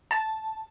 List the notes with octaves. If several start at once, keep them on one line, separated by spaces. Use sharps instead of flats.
A5